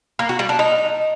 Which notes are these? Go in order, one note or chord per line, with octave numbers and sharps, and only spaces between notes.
A#3
F#4
G3
D4
D#4